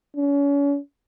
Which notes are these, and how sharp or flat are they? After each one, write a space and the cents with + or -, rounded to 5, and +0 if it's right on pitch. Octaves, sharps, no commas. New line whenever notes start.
C#4 +35